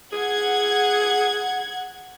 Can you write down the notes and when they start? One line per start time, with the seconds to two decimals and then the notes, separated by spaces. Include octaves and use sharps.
0.12 G#4 F#5 G#6